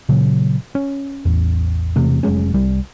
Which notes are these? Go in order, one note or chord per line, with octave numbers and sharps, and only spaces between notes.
A#2 C#3 F#3
C#4
A1 E2
E1 E2 C3 A3
F1 F#3 G#3 C#4
C2 G3